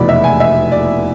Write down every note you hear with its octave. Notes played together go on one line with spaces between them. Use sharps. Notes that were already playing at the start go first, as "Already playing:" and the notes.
Already playing: F1 E2 B2 D5 B5
E5
G#5
E5
D5